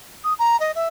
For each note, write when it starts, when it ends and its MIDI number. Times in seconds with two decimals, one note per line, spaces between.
0.24 0.33 87
0.39 0.59 82
0.60 0.71 75
0.75 0.87 76